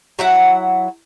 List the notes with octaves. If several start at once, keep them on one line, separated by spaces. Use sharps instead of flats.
F#3 E4 F#5